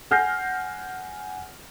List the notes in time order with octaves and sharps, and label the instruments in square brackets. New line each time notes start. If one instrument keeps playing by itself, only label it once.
[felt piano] F#5 G#5 F6 G6 A#6 C7